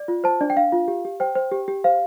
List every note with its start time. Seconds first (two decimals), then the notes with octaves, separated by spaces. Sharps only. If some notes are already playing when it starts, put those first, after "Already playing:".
Already playing: D5
0.08 F4
0.24 C5 A5
0.41 D4 D5
0.50 G5
0.56 D4 F5
0.72 F4
0.88 G4
1.05 G4
1.20 C5 G5
1.35 C5
1.52 G4
1.68 G4
1.84 C5 F5